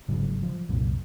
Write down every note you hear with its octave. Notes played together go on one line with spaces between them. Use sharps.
G1 G#2 C#3 F#3
F3
C2 F#2 A#2